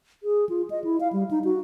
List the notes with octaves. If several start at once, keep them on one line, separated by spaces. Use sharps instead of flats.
G#4
F4
D#5
E4
F5
G3
D#4
F#4